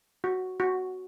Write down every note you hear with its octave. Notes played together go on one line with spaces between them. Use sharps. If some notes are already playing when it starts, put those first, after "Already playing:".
F#4
F#4